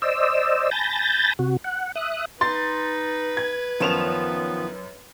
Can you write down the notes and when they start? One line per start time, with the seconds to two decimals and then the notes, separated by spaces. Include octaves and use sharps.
0.02 C5 D5 D#5 E6
0.71 G#5 A5 B5 G6 A6 A#6
1.39 C3 F#4
1.64 F#5
1.95 E5 D#6 F#6
2.41 D#4 B4 C6 A6
3.37 G#6
3.80 F#2 D#3 F3 B3 E7 F7